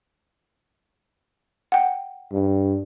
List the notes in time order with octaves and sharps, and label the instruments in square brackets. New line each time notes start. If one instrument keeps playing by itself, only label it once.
[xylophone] F#5 G5
[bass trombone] G2